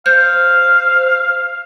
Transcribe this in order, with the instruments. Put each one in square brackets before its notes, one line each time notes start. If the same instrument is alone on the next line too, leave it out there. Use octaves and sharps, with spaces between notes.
[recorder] C5 [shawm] F5 [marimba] G6